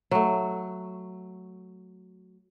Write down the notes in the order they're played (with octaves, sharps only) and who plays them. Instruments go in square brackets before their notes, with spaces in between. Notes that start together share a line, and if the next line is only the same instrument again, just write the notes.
[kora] F#3 A3